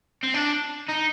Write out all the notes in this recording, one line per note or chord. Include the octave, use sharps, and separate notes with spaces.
C4
D4
D#4